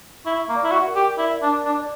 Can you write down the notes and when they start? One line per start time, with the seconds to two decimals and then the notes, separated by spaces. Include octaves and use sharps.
0.25 E4 C#6
0.49 A#3
0.56 D5
0.64 E4
0.71 F#4
0.87 A#4
0.95 G4
1.18 E4 D5
1.42 D4
1.50 D5
1.65 D4
1.81 D5